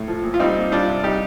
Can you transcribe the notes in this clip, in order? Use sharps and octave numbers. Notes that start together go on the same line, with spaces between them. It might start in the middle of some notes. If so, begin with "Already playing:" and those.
Already playing: A2
F3
A#2
F4
G3 C4 D#4
A#2
G3 D4 F4
C3
G3 D#4 G4